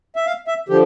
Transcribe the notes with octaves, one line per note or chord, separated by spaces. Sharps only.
E5
F5
E5
D3 F3 G4